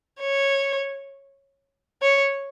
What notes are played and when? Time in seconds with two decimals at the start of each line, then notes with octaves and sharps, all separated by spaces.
0.21 C#5
2.02 C#5